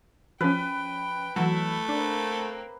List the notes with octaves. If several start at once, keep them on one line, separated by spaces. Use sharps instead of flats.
F3 C#4 B4 G5
E3 F#3 A3 E4
A#3 C4 D4